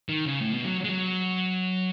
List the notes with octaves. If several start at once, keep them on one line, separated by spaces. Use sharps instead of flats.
D#3
C#3
A2
B2
F#3
G#3
F#3